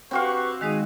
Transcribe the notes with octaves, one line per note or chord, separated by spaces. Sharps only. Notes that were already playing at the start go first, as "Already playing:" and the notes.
C4 F#4 G4 B4 F5 C#6
D#3 G#3 D#4 F#4 G#4 G#5